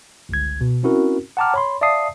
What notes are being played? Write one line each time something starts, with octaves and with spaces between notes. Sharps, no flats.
G1 C#2 G#6
B2
C4 C#4 E4 F#4 A#4
F#5 G5 A5 A#5 D6 F6
C#5 B5 C6
D5 E5 F5 A5 D#6 C7